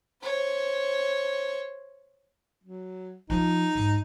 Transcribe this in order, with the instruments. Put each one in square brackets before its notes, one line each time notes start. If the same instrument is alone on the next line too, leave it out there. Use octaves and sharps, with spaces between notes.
[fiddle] C5 C#5
[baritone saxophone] F#3
[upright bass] F3 [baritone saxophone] D#4
[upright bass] E2 G#2